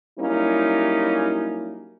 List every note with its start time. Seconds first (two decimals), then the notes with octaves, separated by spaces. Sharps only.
0.19 F#3 G3 A#3 C#4 D#4 E4